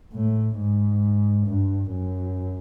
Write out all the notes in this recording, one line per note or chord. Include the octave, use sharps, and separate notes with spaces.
A2
G#2
G2
F#2